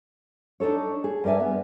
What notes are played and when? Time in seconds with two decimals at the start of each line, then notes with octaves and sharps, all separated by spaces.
0.60 D4 D#4 G#4 A4 C#5
1.04 G#4
1.24 G2 A#4 D5 E5 G#5
1.40 B3